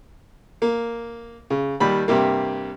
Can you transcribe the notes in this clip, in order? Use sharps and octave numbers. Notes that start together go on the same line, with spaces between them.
A#3
C#3
D#2 G3 B5
G2 C3 A#3